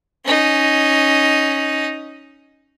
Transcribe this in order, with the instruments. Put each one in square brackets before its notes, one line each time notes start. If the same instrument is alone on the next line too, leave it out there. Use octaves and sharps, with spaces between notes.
[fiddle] C#4 D#4